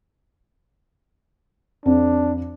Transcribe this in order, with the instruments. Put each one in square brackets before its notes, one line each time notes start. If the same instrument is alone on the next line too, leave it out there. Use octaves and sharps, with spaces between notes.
[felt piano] F2 [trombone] D4